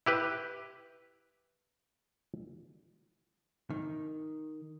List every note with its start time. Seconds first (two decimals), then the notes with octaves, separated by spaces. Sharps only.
0.06 E4 G4 B4
3.70 D#3